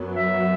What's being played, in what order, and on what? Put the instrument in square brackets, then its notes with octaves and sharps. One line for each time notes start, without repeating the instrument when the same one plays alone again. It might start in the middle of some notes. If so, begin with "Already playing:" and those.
Already playing: [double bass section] F#2 F#3 B3
[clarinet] E5